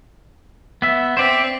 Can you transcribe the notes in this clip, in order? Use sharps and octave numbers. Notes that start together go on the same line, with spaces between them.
B3 E5
C4 C5 D5 E5